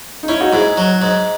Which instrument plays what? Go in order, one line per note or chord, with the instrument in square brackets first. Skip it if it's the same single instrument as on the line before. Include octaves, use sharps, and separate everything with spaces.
[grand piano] D#4
[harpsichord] C#4 [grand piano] E4
[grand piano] D#4 F#4
[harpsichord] G#2 [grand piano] E4 G#4
[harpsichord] F#3
G#2